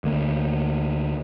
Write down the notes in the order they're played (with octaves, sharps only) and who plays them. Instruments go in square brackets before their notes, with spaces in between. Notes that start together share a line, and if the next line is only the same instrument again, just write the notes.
[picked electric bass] D2 D3 A#3